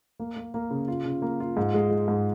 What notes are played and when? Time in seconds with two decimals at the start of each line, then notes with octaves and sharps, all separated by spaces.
0.20 A#3
0.36 A#3
0.54 A#3
0.71 C#3
0.88 F4
1.05 C#3
1.22 A#3
1.40 F4
1.57 G#2
1.74 G#3
1.91 G#3
2.08 G#2